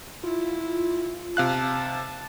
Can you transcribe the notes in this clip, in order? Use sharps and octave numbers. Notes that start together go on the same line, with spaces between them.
E4 F4
C3 F5 A5 F#6